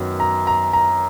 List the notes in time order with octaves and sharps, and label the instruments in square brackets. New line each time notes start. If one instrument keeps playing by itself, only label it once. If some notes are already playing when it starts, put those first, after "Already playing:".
Already playing: [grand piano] F#2 D#3 F#3 B3
A#5
A#5
A#5